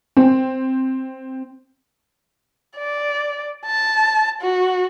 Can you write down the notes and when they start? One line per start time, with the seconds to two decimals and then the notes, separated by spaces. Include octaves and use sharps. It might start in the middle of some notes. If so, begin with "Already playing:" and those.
0.17 C4
2.78 D5
3.66 A5
4.42 F#4